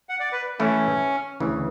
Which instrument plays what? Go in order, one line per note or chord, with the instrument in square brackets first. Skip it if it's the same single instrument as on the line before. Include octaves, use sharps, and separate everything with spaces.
[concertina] F#5
D5
B4
[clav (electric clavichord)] E3 A3 E4 A4 [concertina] C#4
[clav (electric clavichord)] D2 C#3 E3